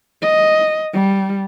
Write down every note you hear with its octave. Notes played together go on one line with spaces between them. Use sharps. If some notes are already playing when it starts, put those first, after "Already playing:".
D#5
G3